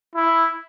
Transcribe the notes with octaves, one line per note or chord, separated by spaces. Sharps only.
E4